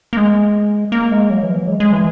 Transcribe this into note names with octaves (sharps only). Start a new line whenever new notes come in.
A#3
G#3
A#3
G#3
F#3
E3
F#3
G#3
G#3
E3